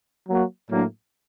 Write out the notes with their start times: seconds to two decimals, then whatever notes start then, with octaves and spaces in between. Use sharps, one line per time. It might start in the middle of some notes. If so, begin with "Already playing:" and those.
0.29 F#3 A#3 F#4
0.69 A2 F#3 A#3 D4